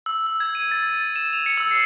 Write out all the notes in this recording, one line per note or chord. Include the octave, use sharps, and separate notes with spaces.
E6
E6
G#6
D#7
A6
A6
E7
F7
C#7
E6
C7